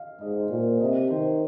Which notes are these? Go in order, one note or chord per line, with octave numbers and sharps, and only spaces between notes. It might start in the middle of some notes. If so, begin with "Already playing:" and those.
Already playing: D#5 F5
G#2 D#5
C5
A#2
A#4
C5
C3 D#5
D#3 C5